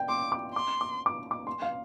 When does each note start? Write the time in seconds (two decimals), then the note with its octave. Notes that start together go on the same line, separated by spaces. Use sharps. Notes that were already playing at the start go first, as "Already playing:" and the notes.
Already playing: D5 F5 G5
0.09 C6 D6
0.32 D6
0.54 C6 D6
0.81 D6
1.06 D6
1.31 D6
1.47 C6
1.62 F5